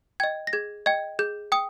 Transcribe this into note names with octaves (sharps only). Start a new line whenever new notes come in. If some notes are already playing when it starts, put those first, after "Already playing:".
D#5 G5 G#6
A#6
G#4 G#6
D#5 G5 G#6
G#4 G6
G5 D#6